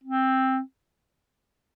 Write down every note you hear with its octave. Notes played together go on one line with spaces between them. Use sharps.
C4